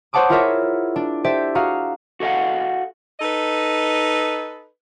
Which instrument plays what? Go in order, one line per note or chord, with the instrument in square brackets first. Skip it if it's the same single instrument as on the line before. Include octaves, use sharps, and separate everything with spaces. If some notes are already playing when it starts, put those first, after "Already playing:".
[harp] C5 C#5 F#5 A5 D6 D#6
E4 F4 G#4 A#4 C#5 E5
D4
G4 A4 C5 D5 E5
F#4 G#4 F5 A#5
[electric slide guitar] F#4 A4 D#5 F5 F#5
[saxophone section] D#4 A4 B4 D#5